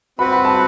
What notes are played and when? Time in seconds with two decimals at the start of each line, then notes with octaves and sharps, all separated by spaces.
0.19 C4 F#4 B4 F#5 B5
0.32 B5
0.45 A5